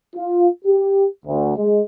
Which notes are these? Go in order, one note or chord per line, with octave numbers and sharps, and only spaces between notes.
F4
G4
D2
G#3